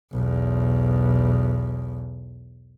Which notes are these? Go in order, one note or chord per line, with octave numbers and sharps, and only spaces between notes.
B1 E2